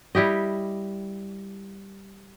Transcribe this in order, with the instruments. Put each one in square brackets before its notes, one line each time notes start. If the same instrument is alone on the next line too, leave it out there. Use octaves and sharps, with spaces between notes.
[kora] G3 E4 G4 D#5